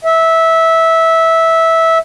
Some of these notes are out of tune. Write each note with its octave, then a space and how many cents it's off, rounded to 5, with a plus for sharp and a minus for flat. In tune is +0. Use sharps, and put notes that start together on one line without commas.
E5 -15